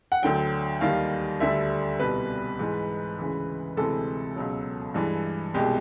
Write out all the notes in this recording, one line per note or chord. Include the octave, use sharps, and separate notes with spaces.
F#5
D2 D3 F#3 G5
D#2 D#3 G3 F5
D2 D3 G3 E5
C2 B2 G3 B4
G#2 E3 G#3
D2 C#3 E3 G#3
D2 C3 E3 G#3 A4
C#2 B2 F#3
G2 E3 G#3
C2 B2 G#3 G4